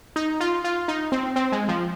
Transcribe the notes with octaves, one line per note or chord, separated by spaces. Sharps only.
D#4
F4
F4
D#4
C4
C4
G#3
F3